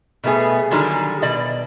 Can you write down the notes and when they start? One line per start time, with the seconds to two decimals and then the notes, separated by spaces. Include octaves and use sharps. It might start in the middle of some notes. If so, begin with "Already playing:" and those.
0.24 B2 G3 A3 B3 G#4
0.71 D3 D#3 F#3 G3 G#4
1.22 B2 D5 D#5